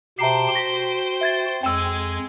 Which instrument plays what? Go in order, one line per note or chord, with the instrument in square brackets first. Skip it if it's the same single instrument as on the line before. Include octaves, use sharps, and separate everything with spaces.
[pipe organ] B2 G4 A5 [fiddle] C5 G5 [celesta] E5 A#5 C7
[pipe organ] F#4 [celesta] A#6 B6
[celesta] E5 G#6 A6
[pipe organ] F2 [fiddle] G#3 G#5 [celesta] G5 E6